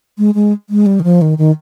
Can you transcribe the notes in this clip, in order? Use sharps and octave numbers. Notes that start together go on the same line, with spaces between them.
G#3
G#3
G#3
G3
D#3
F3
D#3
D#3